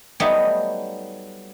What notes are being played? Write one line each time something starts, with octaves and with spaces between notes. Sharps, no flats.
F#3 G3 A3 B3 D#4 G4